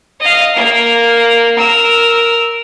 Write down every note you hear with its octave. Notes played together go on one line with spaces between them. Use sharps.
D#5 F5
A#3 A#4
A#4 E6